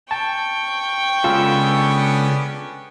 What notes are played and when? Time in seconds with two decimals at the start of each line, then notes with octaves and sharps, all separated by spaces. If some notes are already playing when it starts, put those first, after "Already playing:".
0.11 G5 A5 C#6
1.24 C#3 G#3 B3 C#4 D4 F4 A4